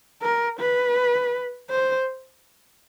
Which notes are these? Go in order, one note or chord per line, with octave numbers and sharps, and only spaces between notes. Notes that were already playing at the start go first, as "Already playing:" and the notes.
A#4
B4
C5